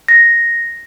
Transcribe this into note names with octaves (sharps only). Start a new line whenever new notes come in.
A#6